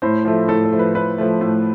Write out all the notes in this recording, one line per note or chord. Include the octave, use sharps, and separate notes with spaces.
A2 C5
F3 A3
A2 A4
A4
F3 A3
B4
A2 B4
F3 A3
A2